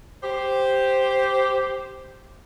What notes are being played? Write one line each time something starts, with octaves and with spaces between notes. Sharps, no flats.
G4 C5